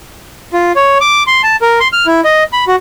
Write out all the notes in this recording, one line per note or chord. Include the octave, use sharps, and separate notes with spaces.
F4
C#5
D6
C6
A5
A#4
C6
F6
E4
D#5
B5
F#4